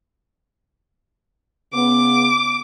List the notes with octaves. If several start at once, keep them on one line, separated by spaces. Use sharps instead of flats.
C#3 B3 D6